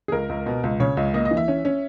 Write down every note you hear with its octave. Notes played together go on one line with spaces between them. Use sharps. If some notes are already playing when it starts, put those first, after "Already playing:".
G#4
C#2 A#4
C#2
B2
C#2
C#3 C#5
C#2
A#3 D#5
D#5
E3
E5
C#4
C#4